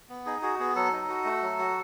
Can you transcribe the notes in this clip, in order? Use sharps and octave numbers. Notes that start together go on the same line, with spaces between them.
B3
D#4 G#4
F#4 G#4
B3 G#4
F#3 A4
D#4
F#4
A3
F#3
F#4